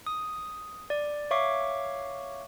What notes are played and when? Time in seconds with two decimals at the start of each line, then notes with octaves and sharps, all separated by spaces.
0.07 D#6
0.90 D5
1.31 C#5 E5 F5 C#6 D6